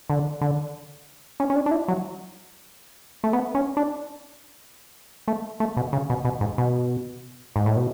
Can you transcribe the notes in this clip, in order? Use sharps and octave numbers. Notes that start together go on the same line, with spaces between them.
D3
D3
C#4
C#4
D4
D4
E4
F#3
A3
B3
C#4
D4
A3
A3
B2
C#3
B2
B2
G#2
B2
G#2
A2
B2